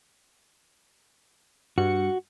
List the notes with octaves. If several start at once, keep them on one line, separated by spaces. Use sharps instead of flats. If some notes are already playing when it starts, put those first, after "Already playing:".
G2 F#4 C#7